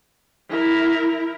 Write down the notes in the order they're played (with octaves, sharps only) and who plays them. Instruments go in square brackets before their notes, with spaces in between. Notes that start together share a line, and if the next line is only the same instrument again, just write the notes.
[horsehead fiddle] E4 A#4